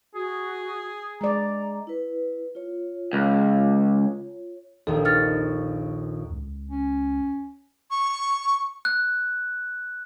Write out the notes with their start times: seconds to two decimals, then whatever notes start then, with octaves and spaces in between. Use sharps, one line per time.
0.15 F#4 G#4
1.21 G#3 D5 A#5
1.87 E4 B4
2.55 F4 C#5
3.13 C#2
4.87 A#1 D#2 A4
5.05 C#5 F6 A6
6.31 C#2
6.70 C#4
7.91 C#6
8.85 F#6